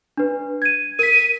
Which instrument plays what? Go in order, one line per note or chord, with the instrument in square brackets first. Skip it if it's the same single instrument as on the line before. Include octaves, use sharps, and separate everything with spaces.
[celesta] D4 B4
G#6 D#7
[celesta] A#4 B6 [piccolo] D#7